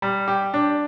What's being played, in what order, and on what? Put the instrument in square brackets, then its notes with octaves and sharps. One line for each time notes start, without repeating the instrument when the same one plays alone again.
[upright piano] G3
G4
D4